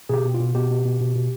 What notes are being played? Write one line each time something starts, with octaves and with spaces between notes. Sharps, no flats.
B2 G4 G#4
B2
F4
B2
B2 G4
B2
B2
B2
B2